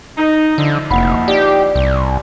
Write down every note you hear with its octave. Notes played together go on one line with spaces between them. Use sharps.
D#4
D3 F3 D#4 E4
F1 A#3 F#5 B5
G4 D5
C2